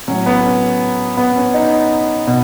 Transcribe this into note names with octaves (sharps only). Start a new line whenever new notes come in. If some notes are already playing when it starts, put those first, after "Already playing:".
A2 F#3 C#4
B3
C#4
B3
C#4
D#4
B2